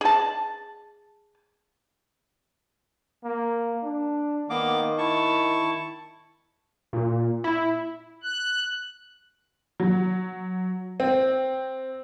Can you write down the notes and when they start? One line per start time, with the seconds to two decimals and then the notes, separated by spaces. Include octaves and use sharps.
0.01 G#4 A5
3.24 A#3
3.83 D4
4.50 D#3 A#3 B3 D6
4.98 E4 A5 C#6
6.93 A#2
7.44 E4
8.23 F#6
9.80 F#3
11.00 C4